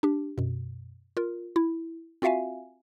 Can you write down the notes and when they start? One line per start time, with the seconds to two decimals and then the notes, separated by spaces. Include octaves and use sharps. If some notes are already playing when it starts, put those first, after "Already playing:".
0.03 D4 G4
0.38 F#2 B2
1.17 F4 A#4
1.56 E4
2.22 C4 F4 F#4 E5 F5 G#5